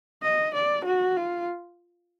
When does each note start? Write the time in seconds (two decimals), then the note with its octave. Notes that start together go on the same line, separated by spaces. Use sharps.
0.23 D#5
0.54 D5
0.85 F#4
1.17 F4